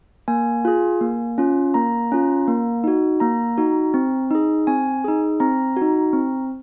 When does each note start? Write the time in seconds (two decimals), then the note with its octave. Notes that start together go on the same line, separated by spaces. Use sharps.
0.28 A#3 G#5
0.65 F4 G#4
1.01 A#3
1.38 C#4 F4
1.74 A#3 A#5
2.12 C#4 F4
2.48 A#3
2.84 D#4 F#4
3.20 A#3 A#5
3.58 D#4 F#4
3.94 C4
4.31 D#4 G#4
4.67 C4 G#5
5.04 D#4 G#4
5.40 C4 A#5
5.76 F#4
5.82 D#4
6.13 C4